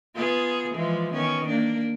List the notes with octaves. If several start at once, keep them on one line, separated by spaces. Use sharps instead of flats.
B3 F4 G#4
E3 F3 G#3
D#3 B3 C#4
A#3 D4